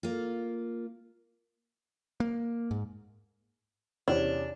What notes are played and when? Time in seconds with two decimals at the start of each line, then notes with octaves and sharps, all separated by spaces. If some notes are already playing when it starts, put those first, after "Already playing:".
0.03 A#3 F4
2.20 A#3
2.71 G#2
4.08 E2 C3 C#4 D4